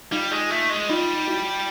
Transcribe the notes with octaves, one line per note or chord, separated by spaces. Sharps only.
G3 D#4 F4
G#3
A3
G#3
G3 D#4 F4
E4 F#4